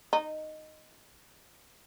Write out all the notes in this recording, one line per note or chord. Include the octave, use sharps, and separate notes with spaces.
D#4